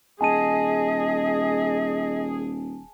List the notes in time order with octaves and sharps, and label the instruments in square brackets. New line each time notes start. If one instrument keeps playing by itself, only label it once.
[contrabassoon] D#1 [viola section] G#4 [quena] D#5 [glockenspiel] G#5 A5 D#7